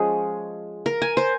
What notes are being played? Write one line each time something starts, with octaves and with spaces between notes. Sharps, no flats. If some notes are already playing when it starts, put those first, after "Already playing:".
Already playing: F3 G#3 C#4 G#4
A#4
G#5
C5